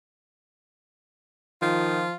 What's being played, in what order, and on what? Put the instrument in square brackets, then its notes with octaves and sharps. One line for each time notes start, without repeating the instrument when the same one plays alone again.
[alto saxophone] D#3 [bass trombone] F3 [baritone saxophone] F4